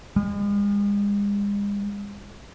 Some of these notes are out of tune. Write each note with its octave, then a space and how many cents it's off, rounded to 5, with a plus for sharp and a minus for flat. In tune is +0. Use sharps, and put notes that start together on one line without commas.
G#3 -40